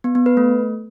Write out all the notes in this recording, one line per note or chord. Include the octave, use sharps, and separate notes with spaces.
B3
B3
B4
A3